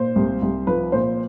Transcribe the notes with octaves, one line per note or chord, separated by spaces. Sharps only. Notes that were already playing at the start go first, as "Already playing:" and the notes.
Already playing: A#2 C5
C2
C2
F3 B4
A#2 C5